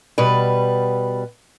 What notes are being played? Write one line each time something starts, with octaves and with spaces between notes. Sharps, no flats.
B2 G3 B4